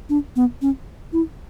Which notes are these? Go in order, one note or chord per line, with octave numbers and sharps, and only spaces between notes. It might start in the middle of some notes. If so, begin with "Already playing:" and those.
D4
B3
C#4
E4